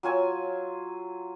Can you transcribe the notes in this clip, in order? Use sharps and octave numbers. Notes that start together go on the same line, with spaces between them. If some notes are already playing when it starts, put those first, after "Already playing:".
F#3 F4 G#5 E6